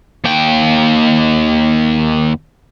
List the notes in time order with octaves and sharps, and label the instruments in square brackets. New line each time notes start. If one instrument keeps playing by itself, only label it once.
[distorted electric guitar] D#2 G5